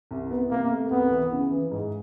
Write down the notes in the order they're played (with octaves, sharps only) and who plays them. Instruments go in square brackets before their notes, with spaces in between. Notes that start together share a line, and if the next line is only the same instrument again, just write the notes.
[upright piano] C2
B3
[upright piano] C3 [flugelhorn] A#3
[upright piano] A3
[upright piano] C2 [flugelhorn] B3
[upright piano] E3
C#3
E3
G#2